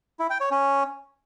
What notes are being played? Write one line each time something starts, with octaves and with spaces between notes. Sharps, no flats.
E4
G5
C#5
C#4